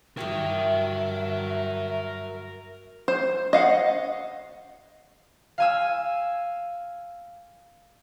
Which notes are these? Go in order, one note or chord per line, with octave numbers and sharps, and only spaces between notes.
G2 F#3 E4 F#4 G4 A#4 E5 G5
C5
D#5 F5 F#5
F5 G#5 E6